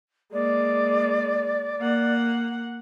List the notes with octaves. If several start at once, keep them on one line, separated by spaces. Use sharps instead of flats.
G#3 A#3 D5
A#3 F#5